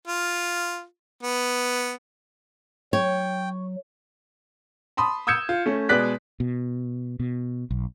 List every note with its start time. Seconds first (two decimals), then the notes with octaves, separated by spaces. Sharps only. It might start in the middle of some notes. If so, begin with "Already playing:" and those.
0.08 F4
1.23 B3
2.93 F#3 C#5 G5
4.97 A5 B5 C6 D#6
5.27 D#6 E6 G6 G#6 C#7 E7
5.49 F4
5.66 A3 C#4
5.89 B2 G#3 B4 D5 F#6 B6
6.40 B2
7.20 B2
7.71 B1